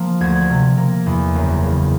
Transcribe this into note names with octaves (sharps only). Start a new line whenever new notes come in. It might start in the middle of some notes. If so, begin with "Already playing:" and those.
Already playing: F3 A#3
D2 G#6
C3
A#3
E2
F#1
C#3